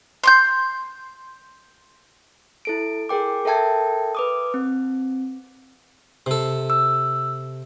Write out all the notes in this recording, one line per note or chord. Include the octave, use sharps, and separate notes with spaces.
C6 D6 G6
E4 A4 D7
G#4 A#4 G5 D6
A4 A#4 E5 G5 A5 G#6
B4 D6 D#6
C4
C3 A4
E6